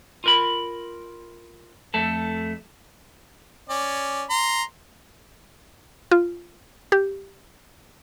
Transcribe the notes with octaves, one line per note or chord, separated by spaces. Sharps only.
F4 A#4 B5
F2 A3 A4
C#4 D5
A#5 C6
F4
G4